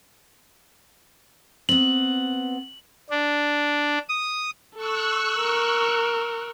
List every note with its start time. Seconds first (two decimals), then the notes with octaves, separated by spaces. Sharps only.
1.69 B3 C4 F#7
3.10 D4
4.09 D#6
4.75 A4 C#6 E6 F#6
5.40 A#4